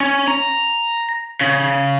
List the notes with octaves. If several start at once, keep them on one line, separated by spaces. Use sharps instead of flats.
C#4
A#5
C#3